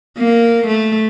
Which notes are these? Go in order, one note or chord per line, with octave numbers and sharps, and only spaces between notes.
A#3
A3